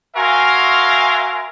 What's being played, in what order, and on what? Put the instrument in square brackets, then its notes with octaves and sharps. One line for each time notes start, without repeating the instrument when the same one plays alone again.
[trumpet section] F#4 A#4 E5 F5 G#5 C6